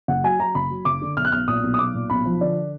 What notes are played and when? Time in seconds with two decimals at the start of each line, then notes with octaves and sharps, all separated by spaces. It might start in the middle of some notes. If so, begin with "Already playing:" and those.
0.08 F#1 F#5
0.24 F#3 G#5
0.39 F#3 A#5
0.55 F#1 B5
0.70 F#3
0.85 F#1 D6
1.02 D3
1.17 B1 F6
1.25 F#6
1.32 B1 F6
1.48 A#2 D#6
1.63 B1
1.74 D#6
1.79 B1 D6
1.94 A#2
2.10 B1 B5
2.25 F3
2.41 D3 D5